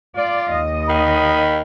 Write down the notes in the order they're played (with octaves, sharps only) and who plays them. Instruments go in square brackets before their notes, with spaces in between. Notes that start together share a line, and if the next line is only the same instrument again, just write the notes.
[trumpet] F4 [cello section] D5
[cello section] D#2 D#5
[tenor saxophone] D#3 [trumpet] B5